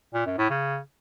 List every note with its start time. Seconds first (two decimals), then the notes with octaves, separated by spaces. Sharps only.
0.14 A#2
0.26 F#2
0.38 A2
0.50 C#3